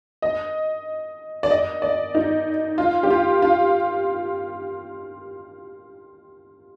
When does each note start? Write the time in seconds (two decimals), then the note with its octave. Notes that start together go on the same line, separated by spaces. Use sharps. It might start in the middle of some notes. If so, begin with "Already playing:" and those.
0.22 D#5
1.43 D5
1.51 D#5
1.82 D5
2.15 D#4
2.78 F4
3.03 G4
3.10 F4
3.42 F4